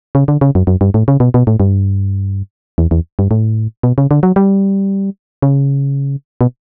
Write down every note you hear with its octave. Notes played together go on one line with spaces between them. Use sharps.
C#3
D3
C#3
F#2
F#2
G2
A2
C#3
B2
B2
A2
G2
E2
E2
G2
A2
B2
C#3
D3
F#3
G3
C#3
B2